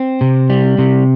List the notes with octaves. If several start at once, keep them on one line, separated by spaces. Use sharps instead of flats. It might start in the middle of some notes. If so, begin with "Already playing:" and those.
Already playing: C4
C3
G3
C3